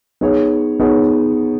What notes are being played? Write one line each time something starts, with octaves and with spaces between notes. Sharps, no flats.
B3 D#4 G#4 C#5
B3 D#4 G#4 C#5